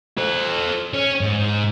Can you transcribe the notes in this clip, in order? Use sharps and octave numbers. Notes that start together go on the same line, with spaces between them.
A4 C5
C#4
G#2